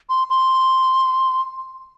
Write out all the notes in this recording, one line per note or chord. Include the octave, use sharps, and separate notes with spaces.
C6
C6